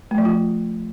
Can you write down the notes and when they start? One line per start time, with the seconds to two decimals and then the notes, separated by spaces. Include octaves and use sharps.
0.11 A3
0.18 F3
0.25 F4